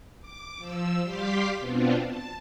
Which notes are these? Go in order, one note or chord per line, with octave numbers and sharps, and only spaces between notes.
D6
F3 E6
G3 G4 F5 C6 D6 B6
B2 B3 C4 D4 F4
A5